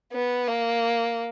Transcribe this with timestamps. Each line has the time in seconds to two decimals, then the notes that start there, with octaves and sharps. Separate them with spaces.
0.13 B3
0.47 A#3